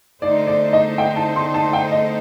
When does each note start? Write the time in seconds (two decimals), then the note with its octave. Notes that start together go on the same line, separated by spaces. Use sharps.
0.22 D3 A3 D#4 A4 C5 D5
0.47 D5
0.73 D#5
0.98 G5
1.16 A5
1.36 C6
1.54 A5
1.73 G5
1.92 D#5